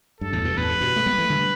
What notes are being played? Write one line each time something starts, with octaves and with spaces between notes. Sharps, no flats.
G2 A4
E2 A2
G2 B2
E2 A2 B4
G2
G2 B2
A3
G3 B3
E3 A3
D3 G3